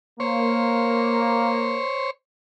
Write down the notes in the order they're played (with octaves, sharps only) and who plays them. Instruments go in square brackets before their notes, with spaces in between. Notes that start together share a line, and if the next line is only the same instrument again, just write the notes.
[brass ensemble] A#3 [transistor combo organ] C5 C#5